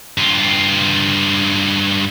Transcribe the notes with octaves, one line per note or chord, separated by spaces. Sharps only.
G2 F4